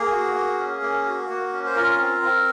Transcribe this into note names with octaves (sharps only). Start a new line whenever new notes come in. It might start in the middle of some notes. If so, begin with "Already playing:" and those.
Already playing: A#3 G#4
F#4
A#3
C#4
A#3
F#4
A#3
C#4
C5
F4 A#4
C4
C4